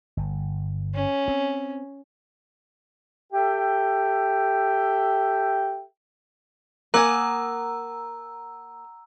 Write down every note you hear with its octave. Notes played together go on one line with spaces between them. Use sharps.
G1
C#4
C4
G4 A4 E5 G5
A#3 F#5 G#5 A#5 D#6 E6